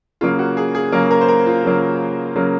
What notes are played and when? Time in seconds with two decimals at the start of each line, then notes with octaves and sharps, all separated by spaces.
0.21 C#3 F#3 A#3 F4
0.39 F#4
0.57 G#4
0.75 G#4
0.92 C#3 F#3 A#3 A#4
1.11 A#4
1.21 C5
1.29 A#4
1.46 F4
1.64 C#3 F#3 A#3
2.36 C#3 F#3 A#3